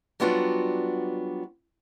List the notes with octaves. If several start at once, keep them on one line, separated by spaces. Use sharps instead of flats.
F#3 G3 B3 D4 F4 F#4